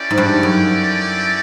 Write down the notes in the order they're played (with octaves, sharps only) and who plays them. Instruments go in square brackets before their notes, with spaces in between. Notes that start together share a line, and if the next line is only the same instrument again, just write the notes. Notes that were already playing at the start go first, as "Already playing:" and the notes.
Already playing: [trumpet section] C#4 E4 A4 D5 G5
[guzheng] G#2
G2
F#2